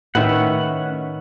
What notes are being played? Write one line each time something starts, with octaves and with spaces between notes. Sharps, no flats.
A2 D#3 C#4 B4 E5 F#5